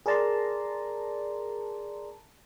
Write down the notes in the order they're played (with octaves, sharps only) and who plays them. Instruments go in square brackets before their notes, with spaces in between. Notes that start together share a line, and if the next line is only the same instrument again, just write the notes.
[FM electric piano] G#4 A#4 D5 A5 A#5 C6